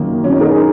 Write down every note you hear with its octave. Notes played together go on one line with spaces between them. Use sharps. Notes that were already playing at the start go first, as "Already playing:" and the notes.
Already playing: F#2 D#3 F#3 A#3
F#2 F#3 C#4 D#4
A#4
G#4